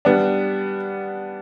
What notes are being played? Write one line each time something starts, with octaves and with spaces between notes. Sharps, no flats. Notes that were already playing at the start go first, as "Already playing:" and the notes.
G3 B3 D4